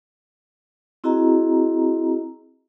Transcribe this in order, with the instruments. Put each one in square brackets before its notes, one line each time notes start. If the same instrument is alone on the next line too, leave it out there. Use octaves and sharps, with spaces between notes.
[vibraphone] C4 E4 F#4 G#4 D#5 A#5